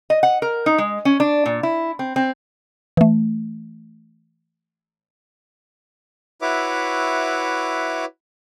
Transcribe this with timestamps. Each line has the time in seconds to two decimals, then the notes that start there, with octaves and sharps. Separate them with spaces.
0.10 D#5
0.23 F#5
0.42 A#4
0.66 D#4
0.78 G#3
1.05 C#4
1.20 D4
1.46 A#2
1.63 E4
1.99 C4
2.16 C4
2.97 E3 A3
6.42 E4 F#4 B4 C#5 E5 D6